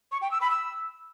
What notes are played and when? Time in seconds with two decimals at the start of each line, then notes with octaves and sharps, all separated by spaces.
0.12 C#6
0.22 G5
0.31 E6
0.41 B5
0.51 E6